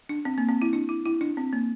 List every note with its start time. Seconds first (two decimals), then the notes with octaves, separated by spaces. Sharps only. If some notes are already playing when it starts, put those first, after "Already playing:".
0.09 D4
0.25 C4
0.38 A#3
0.49 C4
0.62 E4
0.73 D4
0.89 E4
1.06 E4
1.21 D4
1.37 C4
1.53 A#3